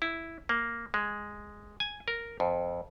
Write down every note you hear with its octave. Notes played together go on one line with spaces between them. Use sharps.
E4
A#3
G#3
G#5
A#4
F2